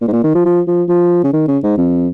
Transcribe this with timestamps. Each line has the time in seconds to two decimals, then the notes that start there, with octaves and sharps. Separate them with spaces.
0.01 A#2
0.08 G#2
0.13 A#2
0.24 D#3
0.35 F3
0.45 F3
0.68 F3
0.89 F3
1.24 C#3
1.33 D#3
1.48 C#3
1.63 G#2
1.77 F2